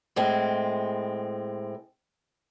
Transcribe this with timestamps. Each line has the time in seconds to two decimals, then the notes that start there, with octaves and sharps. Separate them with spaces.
0.16 A2 G#3 C4